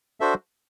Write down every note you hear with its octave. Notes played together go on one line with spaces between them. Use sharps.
D4 F#4 A4 C5 E5